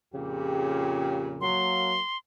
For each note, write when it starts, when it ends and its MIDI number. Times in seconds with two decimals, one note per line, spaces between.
0.14 1.62 41
0.14 1.62 46
0.14 1.62 49
0.14 1.30 67
1.41 2.00 54
1.41 2.00 58
1.41 2.18 84